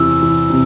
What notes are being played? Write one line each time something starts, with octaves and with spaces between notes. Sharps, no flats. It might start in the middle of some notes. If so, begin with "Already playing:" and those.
Already playing: E2 C3 E3 E6
E3
C3